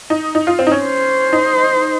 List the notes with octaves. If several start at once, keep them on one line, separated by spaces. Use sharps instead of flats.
D#4
D#4
F4
C4
D#4
C#4
C5
D#4